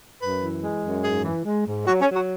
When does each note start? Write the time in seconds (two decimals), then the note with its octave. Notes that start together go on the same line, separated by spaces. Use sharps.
0.22 F#2 B4
0.42 E3
0.63 G#3
0.84 F#2
1.04 G#2 G#4
1.24 E3
1.45 G#3
1.66 G#2
1.87 F#3 F#4
2.01 C#4
2.08 F#3
2.15 F#4